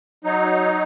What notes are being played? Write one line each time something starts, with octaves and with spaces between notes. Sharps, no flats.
F#3 D#4